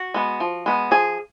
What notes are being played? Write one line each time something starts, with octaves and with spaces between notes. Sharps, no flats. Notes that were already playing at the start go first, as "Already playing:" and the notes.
Already playing: F#4
G#3 B3
F3
G#3 B3
F3 G#4